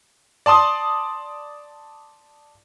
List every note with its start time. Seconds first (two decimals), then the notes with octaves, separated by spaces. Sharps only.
0.46 D5 A5 C6 D#6